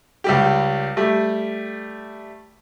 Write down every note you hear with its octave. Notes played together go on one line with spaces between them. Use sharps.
C#2 G3 G4
G3 A3